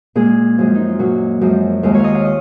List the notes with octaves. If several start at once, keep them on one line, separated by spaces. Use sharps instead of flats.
A#2 G#3 G#4
F#2 F3 G#3
D#4
F4
A#2 F#3 F#4
F#2 F3 G#3
D#2 D#3 G#3 F4
C#5
D#5 F5
F5
D#5